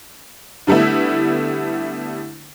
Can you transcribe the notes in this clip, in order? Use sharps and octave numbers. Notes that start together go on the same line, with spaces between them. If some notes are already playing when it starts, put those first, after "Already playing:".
D3 G3 A3 B3 E4